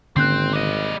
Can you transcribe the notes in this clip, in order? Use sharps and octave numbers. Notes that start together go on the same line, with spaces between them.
G#1 D3 A#3 C4 C#4 F#6 G6 C7
G3 D#5